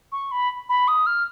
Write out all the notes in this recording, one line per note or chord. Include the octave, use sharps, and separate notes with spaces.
C#6
B5
B5
D#6
F6